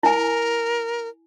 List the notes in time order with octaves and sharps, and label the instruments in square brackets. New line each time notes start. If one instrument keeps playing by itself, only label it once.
[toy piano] E4 G#5 [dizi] A#4